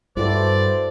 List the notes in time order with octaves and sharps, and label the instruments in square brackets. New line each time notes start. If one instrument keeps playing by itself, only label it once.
[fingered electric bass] G2 [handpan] E4 F#4 A4 [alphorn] C5 [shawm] D5